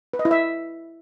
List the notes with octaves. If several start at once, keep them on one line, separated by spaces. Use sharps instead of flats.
B4
D#5
E4
E5